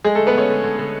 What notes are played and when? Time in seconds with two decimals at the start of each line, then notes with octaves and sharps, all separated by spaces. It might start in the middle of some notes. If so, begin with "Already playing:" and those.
0.04 G#3 A3 G#4
0.15 D3 A3 A4
0.27 B3 B4
0.35 D3 C#4 C#5
0.49 D3
0.64 D3
0.79 D3